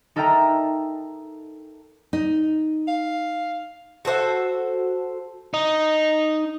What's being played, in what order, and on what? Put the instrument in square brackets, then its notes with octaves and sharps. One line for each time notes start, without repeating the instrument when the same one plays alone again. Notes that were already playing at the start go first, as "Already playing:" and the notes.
[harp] D#4 A4 A#4 E5 G5 A#5
[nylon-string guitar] D#4
[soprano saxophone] F5
[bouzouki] F#4 A4 C5 E5
[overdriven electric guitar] D#4